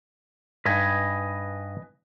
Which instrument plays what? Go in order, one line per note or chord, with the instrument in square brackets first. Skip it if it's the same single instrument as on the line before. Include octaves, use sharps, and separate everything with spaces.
[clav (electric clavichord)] G2 D#4 [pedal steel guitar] B4 D#5 G#5